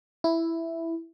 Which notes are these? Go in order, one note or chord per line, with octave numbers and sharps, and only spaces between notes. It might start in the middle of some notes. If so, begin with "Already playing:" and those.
E4